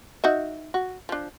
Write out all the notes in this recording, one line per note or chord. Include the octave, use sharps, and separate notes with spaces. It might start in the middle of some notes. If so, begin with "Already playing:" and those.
D#4 F#4 E5
F#4
F3 D4